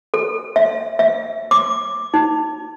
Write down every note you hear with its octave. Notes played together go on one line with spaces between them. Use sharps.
A4
E5
E5
D6
D#4